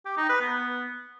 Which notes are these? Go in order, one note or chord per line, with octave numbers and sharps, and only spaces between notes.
G4
D#4
B4
B3